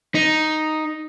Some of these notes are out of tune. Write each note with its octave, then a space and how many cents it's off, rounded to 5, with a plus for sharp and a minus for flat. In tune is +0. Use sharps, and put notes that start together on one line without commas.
D#4 +0